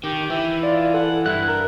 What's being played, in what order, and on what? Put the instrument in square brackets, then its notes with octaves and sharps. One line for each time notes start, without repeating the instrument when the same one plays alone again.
[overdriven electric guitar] D#3 [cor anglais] G4
[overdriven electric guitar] E3 [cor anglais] E5
[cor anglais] F4 [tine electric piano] D5
[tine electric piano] A4 [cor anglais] F#5
[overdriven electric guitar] G2 [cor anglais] E4 [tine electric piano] F#6
[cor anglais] A#4